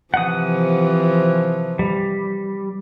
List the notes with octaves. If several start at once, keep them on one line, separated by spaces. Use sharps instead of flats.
C3 E3 F3 F#5 D#6
G3